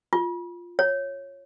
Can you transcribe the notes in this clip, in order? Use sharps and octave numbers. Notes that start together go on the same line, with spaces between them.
F4
C#5